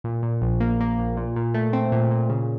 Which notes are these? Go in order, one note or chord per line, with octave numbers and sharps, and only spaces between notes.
A#2
A#2
A#1
A#3
A#3
A#1
A#2
A#2
A3
C4
A#2
A#2
C#3